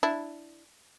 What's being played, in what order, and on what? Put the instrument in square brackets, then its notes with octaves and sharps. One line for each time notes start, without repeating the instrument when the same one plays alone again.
[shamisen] D4 E4